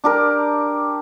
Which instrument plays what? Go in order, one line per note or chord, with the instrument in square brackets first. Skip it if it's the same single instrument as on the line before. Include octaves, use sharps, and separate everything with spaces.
[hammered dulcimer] D4 G4 A#4